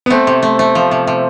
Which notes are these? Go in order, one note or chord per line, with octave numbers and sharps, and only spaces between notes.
B3
A3 C4
C3
A3
A3
F3
C3
C3